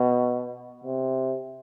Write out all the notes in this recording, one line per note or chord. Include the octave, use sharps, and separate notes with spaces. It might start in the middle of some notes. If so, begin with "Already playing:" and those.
Already playing: B2
C3